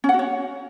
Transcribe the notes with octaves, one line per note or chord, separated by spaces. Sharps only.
C#4
F#5
F#4
C#5